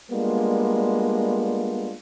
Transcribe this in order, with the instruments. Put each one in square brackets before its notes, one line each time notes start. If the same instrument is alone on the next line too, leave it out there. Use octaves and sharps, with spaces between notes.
[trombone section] G3 G#3 A#3 B3 D4 F4